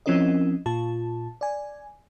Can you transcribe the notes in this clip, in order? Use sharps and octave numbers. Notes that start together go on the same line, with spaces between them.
F3 C4 C#4 E4 A#4 D#5
A#2 F4 A5
D5 G#5